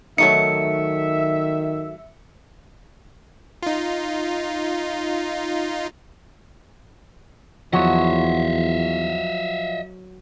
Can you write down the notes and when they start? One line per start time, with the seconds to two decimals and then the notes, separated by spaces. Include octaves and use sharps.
0.18 D#3 F#3 A3 D#4 E5 C#7
3.63 D#4 F4
7.73 E2 F3 F#3 F#4 D#5 E5